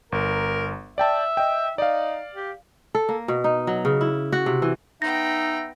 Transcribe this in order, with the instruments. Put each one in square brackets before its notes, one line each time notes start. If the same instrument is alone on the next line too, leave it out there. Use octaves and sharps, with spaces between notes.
[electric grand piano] G1 [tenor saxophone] A#4
[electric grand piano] D5 G5 A5 [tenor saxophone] E5
[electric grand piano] D#5 G5
[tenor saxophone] D#4 [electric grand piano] D5 F5
[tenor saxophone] G4
[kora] A4
A#3
B2
D#4
F#3
C#3
E4
F#4
C3
E3
[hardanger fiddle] B3 G5 [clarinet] D#4 [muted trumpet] E5 [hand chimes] A#6